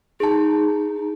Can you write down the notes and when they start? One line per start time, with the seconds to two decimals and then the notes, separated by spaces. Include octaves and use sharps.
0.20 D#4 G#4 A5